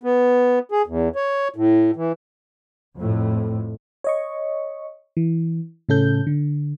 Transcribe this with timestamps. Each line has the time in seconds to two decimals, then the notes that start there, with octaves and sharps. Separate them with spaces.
0.03 B3
0.72 G#4
0.87 E2
1.16 C#5
1.56 A2
1.96 E3
2.97 F2 A2
4.04 C#5 D#5 C#6
5.17 E3
5.89 A2 C#3 C#4 A4 G6
6.27 D3